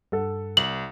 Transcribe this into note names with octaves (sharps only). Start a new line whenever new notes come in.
G2 A4 F#5
C2 F#7